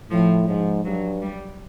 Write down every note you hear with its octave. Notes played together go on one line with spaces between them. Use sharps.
A2 F3
G#2 F3
G2 F#3
G3